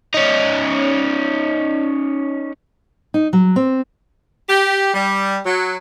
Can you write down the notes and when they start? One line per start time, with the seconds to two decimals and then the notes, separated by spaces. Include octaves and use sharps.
0.14 C#4 D#4
3.14 D#4
3.33 F#3
3.56 C4
4.49 G4
4.94 G3
5.45 F#3